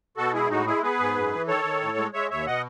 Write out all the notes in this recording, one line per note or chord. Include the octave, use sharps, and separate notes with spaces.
B2 F#4 A4
G#3 E4 G#4
A2 D#4 F#4
G#3 E4 G#4
B3 G#4 B4
G#2
F#2
E3
D#3 A4 C#5
D#3
A2
G#3
G#3 C#5 E5
D#2 C#5 E5
B2 D#5 F#5